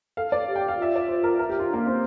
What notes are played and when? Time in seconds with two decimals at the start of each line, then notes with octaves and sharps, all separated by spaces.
0.17 A4 F5
0.32 D5
0.48 G4
0.56 G5
0.68 F5
0.78 F4 E5
0.96 D5
1.08 C5
1.24 A#4
1.39 A#4
1.50 G4
1.59 F4
1.69 A#3 D4
1.87 C4